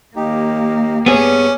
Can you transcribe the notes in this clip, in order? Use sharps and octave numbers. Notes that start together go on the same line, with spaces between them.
D#2 A#3 D#4 G4
G2 B3 C#4 G#4 D5